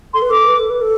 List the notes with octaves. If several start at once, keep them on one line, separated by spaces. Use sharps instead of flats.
A4 C6
B4
A4 D6
B4
A4
B4
A4